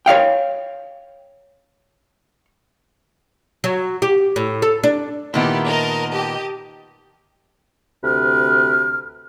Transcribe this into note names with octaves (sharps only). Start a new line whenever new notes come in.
C#5 E5 F5 G5
F#3
G4
A2
A4
D4
A#2 D#3 B3 E4 G4 A5
A#4 D#5 A5
G4 D#5 A5
D2 C3 B4 F6